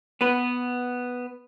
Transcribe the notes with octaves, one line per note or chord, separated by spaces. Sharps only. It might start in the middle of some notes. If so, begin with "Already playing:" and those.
B3 B4